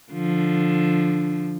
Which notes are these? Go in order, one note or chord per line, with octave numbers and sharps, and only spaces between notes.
D3 F3